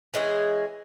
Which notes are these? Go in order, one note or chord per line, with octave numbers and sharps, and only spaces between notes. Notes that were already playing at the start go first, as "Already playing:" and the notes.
E3 G#3 C#4 G#4